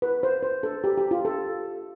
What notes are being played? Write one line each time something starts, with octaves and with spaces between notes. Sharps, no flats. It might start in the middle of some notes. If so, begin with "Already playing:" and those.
B4
C5
C5
A4
G4
G4
F4
A4